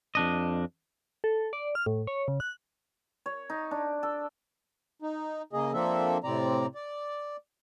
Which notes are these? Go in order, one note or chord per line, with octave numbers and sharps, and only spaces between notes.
F2 D4 D#5
A4
D5
F6
A2
C#5
C#3
F#6
C#5
D#4
D4
A4
D#4
C#3 A#3 G#4 D#5
F3 A#3 C4 D4 A4 E5
A2 C3 C4 D5 A#5
D5